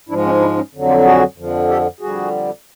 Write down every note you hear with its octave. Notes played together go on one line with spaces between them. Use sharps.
G#2 F3 G#3 D4 E4
C#4 D#4
D4 E4
C#4 D#4
F2 D3 F#3
F4 G4
F#4 G#4
F2 D3 F3
G4 A4
F2 D3 G3 F#4 G#4